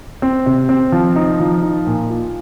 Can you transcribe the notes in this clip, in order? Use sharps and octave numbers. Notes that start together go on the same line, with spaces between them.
C4
C3
C4
F3
D#4
F3
D#4
A#2
F4